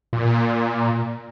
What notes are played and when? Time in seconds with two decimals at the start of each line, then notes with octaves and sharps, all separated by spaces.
0.13 A#2